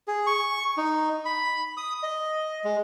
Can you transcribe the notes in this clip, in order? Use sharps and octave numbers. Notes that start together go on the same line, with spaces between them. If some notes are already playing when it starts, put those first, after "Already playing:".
G#4
C#6
D#4
B5
D#6
D#5
G#3